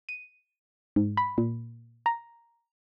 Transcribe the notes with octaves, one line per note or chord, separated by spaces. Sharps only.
D#7
G#2
B5
A#2
A#5